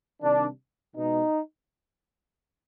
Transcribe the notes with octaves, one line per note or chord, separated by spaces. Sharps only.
C3 D#3 G3 D4
B2 G#3 D#4